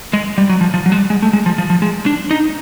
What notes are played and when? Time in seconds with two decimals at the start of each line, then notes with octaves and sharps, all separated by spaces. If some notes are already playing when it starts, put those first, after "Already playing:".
0.13 G#3
0.38 G3
0.49 F#3
0.61 F3
0.74 F3
0.86 F#3
0.92 G#3
0.97 G3
1.10 G#3
1.22 A3
1.33 G#3
1.46 F3
1.58 F3
1.70 F3
1.82 G#3
2.06 D4
2.31 D#4